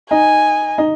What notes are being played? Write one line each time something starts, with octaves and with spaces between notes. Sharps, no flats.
D#4 G#5
D#4